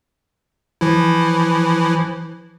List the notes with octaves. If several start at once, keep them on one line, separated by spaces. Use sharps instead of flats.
E3 F3 E4